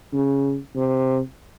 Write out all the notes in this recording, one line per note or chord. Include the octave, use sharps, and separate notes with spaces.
C#3
C3